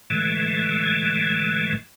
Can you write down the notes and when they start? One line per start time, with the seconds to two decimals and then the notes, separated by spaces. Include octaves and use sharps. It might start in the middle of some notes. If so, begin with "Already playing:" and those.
0.10 A2 D3 E3 G#3 A3